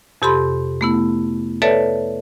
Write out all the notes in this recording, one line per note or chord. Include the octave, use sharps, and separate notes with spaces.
F2 C3 G4 A4 B5 C6
A3 B3 E4
A4 B4 C#5 D5 E5 A5